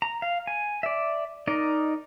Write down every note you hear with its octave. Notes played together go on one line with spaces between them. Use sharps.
A#5
F5
G#5
D5 E5
D#4 A#4 D5 D#5